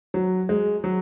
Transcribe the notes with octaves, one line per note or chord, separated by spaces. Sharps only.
F#3
G#3
F#3